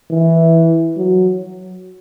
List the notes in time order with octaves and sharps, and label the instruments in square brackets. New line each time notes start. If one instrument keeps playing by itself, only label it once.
[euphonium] E3
F#3